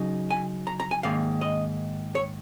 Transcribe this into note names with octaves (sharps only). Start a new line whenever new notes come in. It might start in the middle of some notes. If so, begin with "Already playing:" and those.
Already playing: C#3 F#3 D#4
G#5
A#5
A#5
G#5
G#2 D#3 A#3 F5
D#5
C#5